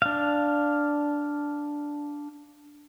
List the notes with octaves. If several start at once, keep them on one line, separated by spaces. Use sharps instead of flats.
D4 F5